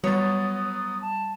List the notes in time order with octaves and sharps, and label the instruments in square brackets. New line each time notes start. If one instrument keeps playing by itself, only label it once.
[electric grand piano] F#3 B3 [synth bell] G3 A6 [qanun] C#5 [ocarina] D#6
[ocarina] A5